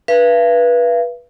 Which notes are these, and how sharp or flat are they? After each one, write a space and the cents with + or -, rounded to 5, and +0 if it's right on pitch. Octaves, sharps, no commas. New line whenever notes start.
B4 -20 F5 -45